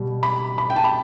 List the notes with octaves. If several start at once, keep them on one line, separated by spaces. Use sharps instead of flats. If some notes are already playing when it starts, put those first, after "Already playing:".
Already playing: B2 G3
B5
B5
G5
A5
B5